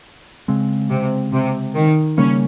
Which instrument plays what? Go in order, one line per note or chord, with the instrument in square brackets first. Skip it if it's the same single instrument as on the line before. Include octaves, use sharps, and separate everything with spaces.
[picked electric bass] C#3 G#3 C4
[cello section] C3
C3
D#3
[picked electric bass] C#3 G3 A#3 [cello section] C#4